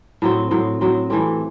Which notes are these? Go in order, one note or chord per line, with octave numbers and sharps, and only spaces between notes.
A2 F#3 C4
A2 F#3 C4
A2 F#3 C4
E3 A3 C4 G4